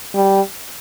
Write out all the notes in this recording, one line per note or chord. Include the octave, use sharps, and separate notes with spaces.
G3